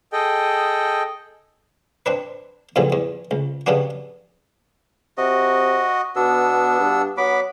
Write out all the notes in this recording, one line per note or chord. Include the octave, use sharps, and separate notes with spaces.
G#4 A4 D#5 G5
C4 D4 B4
F2 A#2 C#3 E3 F#3 G3
E2
C#2
C#3 G3 B3 D4 F#4
C3 F#4 D#5
B2 B3 D4 E6
G2
F#3 B3 B5 D6